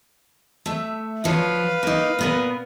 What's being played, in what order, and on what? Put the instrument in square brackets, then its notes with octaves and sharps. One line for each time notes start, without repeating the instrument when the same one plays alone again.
[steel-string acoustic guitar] A3 E5
[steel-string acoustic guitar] D2 F3 C#5 [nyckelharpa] B4 F5
[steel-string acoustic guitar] A#3 D#4
A#2 B3 A#4